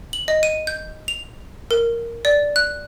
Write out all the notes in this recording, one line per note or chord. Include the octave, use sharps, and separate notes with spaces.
F#7
D#5
D#7
G6
F7
A#4
D5
F#6